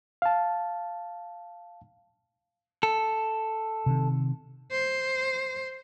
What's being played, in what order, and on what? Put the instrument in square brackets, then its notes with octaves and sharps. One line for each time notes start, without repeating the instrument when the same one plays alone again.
[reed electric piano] F5 A5
[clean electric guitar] A4
[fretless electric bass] C3 D#3
[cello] C5